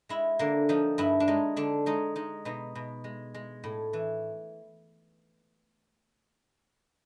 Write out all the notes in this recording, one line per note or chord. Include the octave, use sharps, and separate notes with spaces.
G#3 E4
D3 A#3
F3 D#4
G2 E4
D4
G#3 D#4
D3 D4
G#3 D#4
G#3 D#4
B2 D#4
B2
G#3
G#3
A2
E3